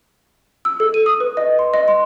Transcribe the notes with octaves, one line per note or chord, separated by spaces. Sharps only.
E6
A4
D#7
D#6
B4
D#5
C6
D#5
C6